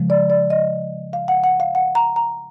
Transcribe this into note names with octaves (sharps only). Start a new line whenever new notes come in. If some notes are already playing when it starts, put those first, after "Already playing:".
Already playing: C#3 F3 G#3
D5
D5
D#5
F5
F#5
F#5
F5
F#5
A#5
A#5